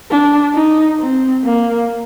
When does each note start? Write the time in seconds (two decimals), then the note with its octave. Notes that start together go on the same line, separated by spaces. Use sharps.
0.10 D4
0.54 D#4
1.00 C4
1.44 A#3